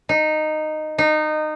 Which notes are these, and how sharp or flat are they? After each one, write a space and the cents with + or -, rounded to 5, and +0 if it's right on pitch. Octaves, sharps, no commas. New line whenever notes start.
D#4 -10
D#4 -20